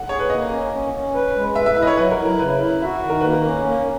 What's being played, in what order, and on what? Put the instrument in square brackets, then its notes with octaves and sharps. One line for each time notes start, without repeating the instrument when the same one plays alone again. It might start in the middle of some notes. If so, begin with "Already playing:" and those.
Already playing: [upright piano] F#5
[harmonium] G#4 [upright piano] C#5
[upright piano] B4
[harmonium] A#3 [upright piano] D#5
[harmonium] C#4
C#4
C#4
B4
G#3
[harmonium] B4 [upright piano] E5
[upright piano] E5
[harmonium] E4 [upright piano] E5
[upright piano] D#5
C#5
[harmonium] F#3 [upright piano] B4
[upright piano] A#4
[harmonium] E4
[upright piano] A#4
[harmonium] C#3 [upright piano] B4
[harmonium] E4
[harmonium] F#4 [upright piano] E5
[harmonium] D#3
[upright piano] A#4
[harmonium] A#3 [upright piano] B4
[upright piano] A#4
[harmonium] C#4
A#3